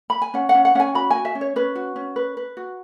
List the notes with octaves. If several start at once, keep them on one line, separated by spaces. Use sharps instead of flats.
B5
G#5
C#4 F#5
F#5
C#4
F#5
C#4 F#5 G#5
F#4 B5
F#4 G#5
E5
C#4
C#5
C#4 B4
F#4
C#4
B4
B4
F#4